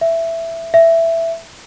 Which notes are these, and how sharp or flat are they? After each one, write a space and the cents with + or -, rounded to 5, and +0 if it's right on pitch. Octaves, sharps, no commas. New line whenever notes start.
E5 +5
E5 +5